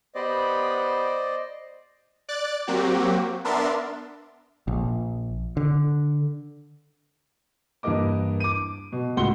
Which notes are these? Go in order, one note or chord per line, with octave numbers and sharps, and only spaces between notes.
B3 G4 C5 D5 D#5 B5
D5 F#6 A6
F#3 A#3 C4 F#4 G4
B3 D4 A#4 E5 C6 A6
A#1
D3
G2 E3 A#3 A#4 D#5 D6
D6 D#7
B2
C#2 A2 F#4 F#5 C6 G7